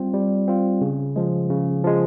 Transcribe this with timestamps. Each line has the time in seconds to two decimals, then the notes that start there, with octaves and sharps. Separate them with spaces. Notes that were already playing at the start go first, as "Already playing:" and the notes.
Already playing: G3 C4 F4
0.14 G3
0.48 C4 F4
0.81 C#3
1.16 F3 G#3
1.50 C#3
1.84 F3 G#3